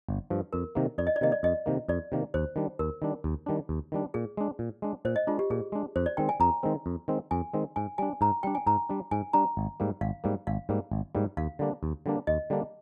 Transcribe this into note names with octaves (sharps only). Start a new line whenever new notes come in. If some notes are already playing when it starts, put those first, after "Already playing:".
G1
G2 F3
F2 A#4
C3 D#3 A#3
F2 D5
D#5
D5
C3 D#3 A#3 D#5
D5
F2 D#5
C3 D#3 A#3
F2 D5
C3 D#3 A#3
D#2 C5
D#3 G3 D4
D#2 A#4
D#3 G3 D4
D#2
D#3 G3 D4
D#2
D#3 G3 D4
A#2 G#4
G#3 D4
A#2
G#3 D4
A#2 C5
D#5
G#3 D4 F4
G4
A#2 G#4
G#3 D4
F2 C5
D5
D#3 G#3 C4 G5
G#5
F2 A#5
D#3 G#3 C4
F2
D#3 G#3 C4
F2 G#5
D#3 G#3 C4
G#2 G#5
G3 D4 G#5
G#2 A#5
G3 D4 G5
G#5
G#2 A#5
G3 D4
G#2 G#5
G3 D4 A#5
G#1
G#2 G3 A#3
G#1 F5
G#2 G3 A#3
G#1 F5
G#2 G3 A#3
G#1
G#2 G3 A#3
D#2 F5
D3 G3 A#3 D4
D#2
D3 G3 A#3 D4
D#2 D#5
D3 G3 A#3 D4